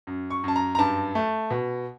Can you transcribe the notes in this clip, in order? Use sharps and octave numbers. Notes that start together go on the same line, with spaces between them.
F#2
C#6
F#2 A5
A#5
A#5
G2 A5
A3
B2